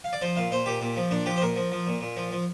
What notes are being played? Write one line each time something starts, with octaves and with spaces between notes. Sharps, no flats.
F5
D5
F3 C5
A#2 F5
A#2 C5
A#2 G4
A#2
F3
A#2 D4
F3 G4
C5
A#2 A#4
F3
F3
A#2
A#2
F3
F3